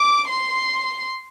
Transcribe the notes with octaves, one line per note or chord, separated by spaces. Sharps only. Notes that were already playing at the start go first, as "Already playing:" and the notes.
Already playing: D6
C6